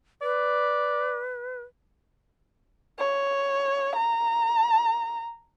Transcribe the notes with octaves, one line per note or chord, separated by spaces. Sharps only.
B4 D5
C#5
A#5